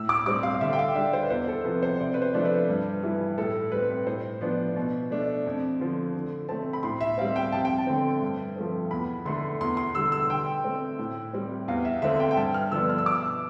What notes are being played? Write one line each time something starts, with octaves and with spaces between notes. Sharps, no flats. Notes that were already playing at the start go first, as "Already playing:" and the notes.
Already playing: A2 E6
D6
G3 C4 D6
F5
F5
D3 E5
G5
F5
G3 D4 E5
C5
B4
E2 C5
A4
C3 F3 B4
C5
C3 D5
B4
C5
F3 A3 D4
B4
G2
E3 G3
A2 A4
G3 C4 B4
A2 C5
F3 B3 D4
B2
A3 D4
F2
D3 F3
D3
A3 C4 A5
B5
A2 C6
E5
G3 C4 F5
G5
F2 A5
G5
A5
D3 A3 C4
G2
F3 A3 C4
E2 B5
D3 A3 C6
E2 C6
C6
D3 G3 E6
E6
D3 G5
A3 C4
A2
G3 C4
E2 F5
E5
D3 A3 C4 E5
G5
G5
G2 A5
F6
D3 F3 B3 D4 E6
F6
E6
B2 D6
E6